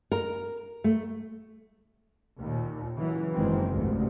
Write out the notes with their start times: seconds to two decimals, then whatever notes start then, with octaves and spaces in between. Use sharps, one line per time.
0.12 A#4
0.84 A3
2.38 D#2 A#2
2.96 C#3 E3 F#3
3.33 F#1 D#3 E3 G#3 C4
3.71 A1 D2 G#2 C3